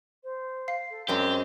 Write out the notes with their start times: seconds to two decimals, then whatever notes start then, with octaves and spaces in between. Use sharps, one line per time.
0.24 C5
0.68 F5 C7
0.90 A4
1.08 F#2 G#3 C4 G4 C5